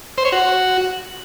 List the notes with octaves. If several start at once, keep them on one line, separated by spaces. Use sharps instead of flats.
C5
C#5
F#4